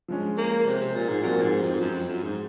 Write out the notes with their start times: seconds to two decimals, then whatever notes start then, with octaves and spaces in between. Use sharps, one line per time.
0.08 F3 G#3 C#4
0.37 A#3
0.66 C3
0.80 C3
0.95 A#2
1.08 G#2
1.22 A#2 F3 C4 F#4 A#4
1.42 G#2
1.61 F2
1.73 G#2
1.80 F#2
1.94 F2
2.09 F#2
2.22 G#2